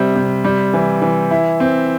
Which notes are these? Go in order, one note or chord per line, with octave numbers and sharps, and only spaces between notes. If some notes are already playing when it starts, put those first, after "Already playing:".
Already playing: C3 G3 C5
C3
G3
E3
E3
E4
C4